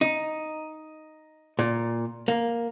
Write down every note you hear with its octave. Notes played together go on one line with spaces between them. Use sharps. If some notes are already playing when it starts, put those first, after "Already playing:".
D#4
A#2
A#3